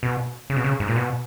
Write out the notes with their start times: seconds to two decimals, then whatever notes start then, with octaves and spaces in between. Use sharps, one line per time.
0.03 B2
0.50 C#3
0.56 B2
0.64 C#3
0.80 G#2
0.88 A#2
0.96 B2